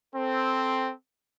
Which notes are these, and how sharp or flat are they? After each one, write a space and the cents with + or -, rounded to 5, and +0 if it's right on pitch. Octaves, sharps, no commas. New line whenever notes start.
C4 +0 A4 -5